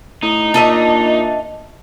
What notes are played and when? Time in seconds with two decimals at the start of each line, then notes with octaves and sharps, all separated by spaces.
0.23 A2 D#4
0.54 A#2 D4 D#5 E5